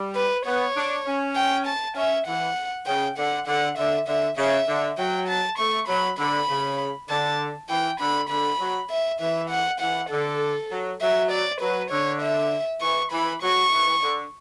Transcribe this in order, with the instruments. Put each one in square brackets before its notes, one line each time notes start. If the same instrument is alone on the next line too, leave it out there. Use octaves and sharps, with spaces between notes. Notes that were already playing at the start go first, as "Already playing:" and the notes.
Already playing: [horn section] G3
[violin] B4
[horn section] B3 [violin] C#5
[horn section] D4
C#4
[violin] G5
A5
[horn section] C#4 [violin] E5
[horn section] E3 [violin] F#5
[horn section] C#3 [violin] G5
[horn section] D3 [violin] F#5
[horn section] D3 [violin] F#5
[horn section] D3 [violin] E5
[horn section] D3 [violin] E5
[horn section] C#3 [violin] E5
[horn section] D3
[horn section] F#3 [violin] G5
[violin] A5
[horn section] A3 [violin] C#6
[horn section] F#3 [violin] B5
[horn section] D3 [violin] B5
[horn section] C#3
[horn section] D3 [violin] A5
[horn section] E3 [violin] G5
[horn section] D3 [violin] B5
[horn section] D3 [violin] B5
[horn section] F#3
[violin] E5
[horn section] E3 [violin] E5
[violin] F#5
[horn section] E3 [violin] F#5
[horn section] D3 [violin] A4
[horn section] F#3
[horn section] F#3 [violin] E5
[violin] D5
[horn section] F#3 [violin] B4
[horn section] D3 [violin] C#5
[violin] E5
[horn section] E3 [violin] C#6
[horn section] E3 [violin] B5
[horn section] F#3 [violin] C#6
[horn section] E3
D3